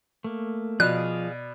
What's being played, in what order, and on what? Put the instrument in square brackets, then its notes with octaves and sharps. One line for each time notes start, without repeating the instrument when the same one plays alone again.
[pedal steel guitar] A3 A#3
[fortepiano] B2 D5 [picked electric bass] F3 [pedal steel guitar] G#4 F5 [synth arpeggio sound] F#6